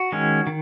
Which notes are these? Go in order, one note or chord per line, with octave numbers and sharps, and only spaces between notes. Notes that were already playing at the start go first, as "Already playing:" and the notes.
Already playing: F#4
D#3 G#3 C#4
D#3